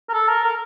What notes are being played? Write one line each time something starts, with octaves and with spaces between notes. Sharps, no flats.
A#4
A4
A#4
A#4